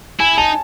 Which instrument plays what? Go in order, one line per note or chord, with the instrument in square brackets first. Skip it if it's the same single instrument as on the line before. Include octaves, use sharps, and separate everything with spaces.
[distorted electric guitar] E4 [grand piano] G#5
[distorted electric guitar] D#4 [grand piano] A5